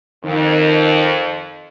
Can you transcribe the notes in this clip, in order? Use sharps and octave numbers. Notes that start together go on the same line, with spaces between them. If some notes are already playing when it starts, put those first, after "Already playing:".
F2 D#3